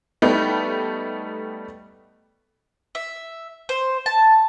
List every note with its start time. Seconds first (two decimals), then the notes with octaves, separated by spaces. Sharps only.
0.22 G3 A3 B3 D#4
2.95 E5
3.69 C5
4.06 A5